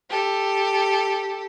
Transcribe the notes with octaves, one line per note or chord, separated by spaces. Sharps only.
G4 A4